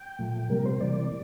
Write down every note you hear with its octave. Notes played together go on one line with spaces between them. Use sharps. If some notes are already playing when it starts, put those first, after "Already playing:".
Already playing: G5
A#2 F3 A3
C3 G3 A#3 A#4
C5
C3 E3 G3 A#3 D5